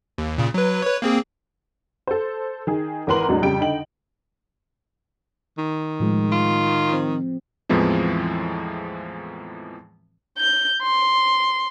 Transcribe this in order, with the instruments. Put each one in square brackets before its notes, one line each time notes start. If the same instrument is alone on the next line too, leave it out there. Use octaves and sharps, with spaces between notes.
[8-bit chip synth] D#2
A#2 C#3
F#3 B4
B4 C#5
A#3 C4 G#4
[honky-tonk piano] A4 C5
D#3 G#4
G#1 E3 A#4 B4 C6 F#7
E2 A2 F#3 G#3 D4
F2 C#3 G3 G4 G5 D7
D3 D#4 G5 F#7
[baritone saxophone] D#3
[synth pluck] A2 F3 G#3
[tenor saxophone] F4
[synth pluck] F3 C4
[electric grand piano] E2 A2 E3 F3 G#3 C4
[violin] G6
C6